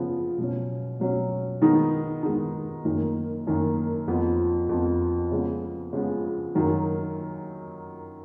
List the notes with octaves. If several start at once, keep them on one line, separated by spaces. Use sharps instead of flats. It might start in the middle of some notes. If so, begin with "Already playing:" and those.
Already playing: C#3 F3 B3
B2 F#3 C#4
B2 F#3 C#4
D#3 G#3 B3 D#4
D#3 G#3 B3 D#4
F#2 D#3 A#3
F#2 D#3 A#3
F2 F3 B3
F2 F3 B3
C#3 F3 G#3 B3
C#3 F3 G#3 B3
F#2 D#3 F#3